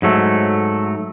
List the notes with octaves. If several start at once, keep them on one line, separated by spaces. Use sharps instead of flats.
G#2 F#3 A3